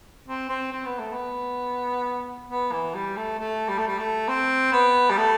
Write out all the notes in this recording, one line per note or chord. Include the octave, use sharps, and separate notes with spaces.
C4
C4
C4
B3
A3
B3
B3
E3
G3
A3
A3
G3
A3
G3
A3
C4
B3
G3
A3